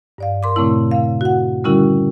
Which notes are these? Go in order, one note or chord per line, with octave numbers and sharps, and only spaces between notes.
G2 D5 F5
A#4 C6 D6
A#2 C#3 A3 C4 E4
C#3 F5
F#4 F#5
D3 G3 C#4 E4 F#4 A#4